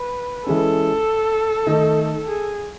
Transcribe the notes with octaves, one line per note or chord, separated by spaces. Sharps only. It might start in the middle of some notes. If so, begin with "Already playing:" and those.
Already playing: B4
E3 G#3 C#4 A4
D#3 A3 D#4
G#4